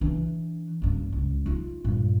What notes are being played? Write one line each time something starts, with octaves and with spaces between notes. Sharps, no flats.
E3 D4
F#1 G2
C#2
D#4 F4
G2 A#2